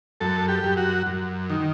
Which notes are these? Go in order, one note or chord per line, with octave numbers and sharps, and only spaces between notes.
F#2 A4
G4
F#2
F#4
F#2
D#3